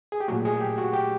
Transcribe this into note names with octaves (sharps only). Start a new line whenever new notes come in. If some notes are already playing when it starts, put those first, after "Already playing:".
G#4
G4
A#2 F#3 A3 F#4
G#4
G4
F#4
G4